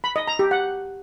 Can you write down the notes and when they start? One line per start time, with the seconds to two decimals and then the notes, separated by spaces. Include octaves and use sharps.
0.04 B5
0.16 D#5
0.27 A#5
0.39 G4
0.51 F#5